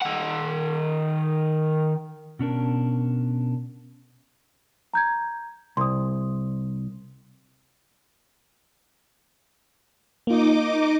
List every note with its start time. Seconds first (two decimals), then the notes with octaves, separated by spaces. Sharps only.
0.01 D#3 F#5
2.39 B2 C#4 D4 A#4
4.94 A#5 G6 G#6
5.77 C2 C6 D#6
10.27 A#3 D#4 F4 D#5 D6